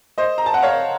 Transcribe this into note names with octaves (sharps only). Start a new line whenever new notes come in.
C5 D#5
A#5
A5
F#5
C#5 F5